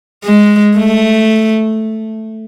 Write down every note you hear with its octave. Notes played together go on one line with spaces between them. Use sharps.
G#3
A3